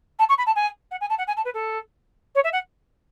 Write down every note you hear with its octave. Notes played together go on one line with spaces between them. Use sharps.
A5
C#6
B5
A5
G#5
F#5
G#5
A5
F#5
G#5
A5
B4
A4
C#5
E5
F#5